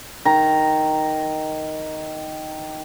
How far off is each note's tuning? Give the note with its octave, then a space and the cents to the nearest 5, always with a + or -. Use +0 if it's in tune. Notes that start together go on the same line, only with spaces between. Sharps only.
D#3 +0 A#5 +0